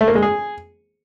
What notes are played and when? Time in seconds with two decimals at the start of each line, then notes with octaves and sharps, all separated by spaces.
0.01 A3
0.08 A#3
0.15 G#3
0.22 G#4